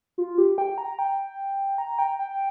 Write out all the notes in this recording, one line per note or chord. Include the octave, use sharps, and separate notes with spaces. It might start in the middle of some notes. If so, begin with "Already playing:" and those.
F4
G4
G5
A#5
G5
A#5
G5
G5